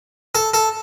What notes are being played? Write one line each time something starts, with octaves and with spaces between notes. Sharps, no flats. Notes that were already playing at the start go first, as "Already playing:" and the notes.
A4
A4